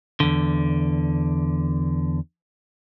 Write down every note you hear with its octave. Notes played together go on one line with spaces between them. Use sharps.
E2 D3